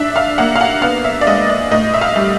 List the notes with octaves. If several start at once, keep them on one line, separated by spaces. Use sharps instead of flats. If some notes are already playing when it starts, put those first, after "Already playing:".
Already playing: D4 E5
F5
A#3 F#5
F5
F#5
B3 F5
E5
D5
G#3 D#5
D5
A2 D#5
E5
F5
G3